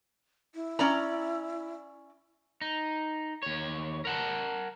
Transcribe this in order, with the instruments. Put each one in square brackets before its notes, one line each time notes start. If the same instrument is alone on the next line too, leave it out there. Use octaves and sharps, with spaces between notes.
[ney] E4
[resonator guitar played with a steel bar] C#4 D5 A#5
[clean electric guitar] D#4
D#2 C#5
A#4 F#5 A5